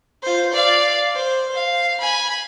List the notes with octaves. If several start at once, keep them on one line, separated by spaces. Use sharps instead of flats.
F4 C5
D5 F5
C5
F5
G#5 B5